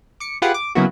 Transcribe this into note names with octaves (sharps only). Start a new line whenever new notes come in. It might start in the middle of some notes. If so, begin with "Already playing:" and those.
D6 C#7
F4 G4 G#4 B4 F#5
D6
C#3 F#3 A#3 B3 E4 F#4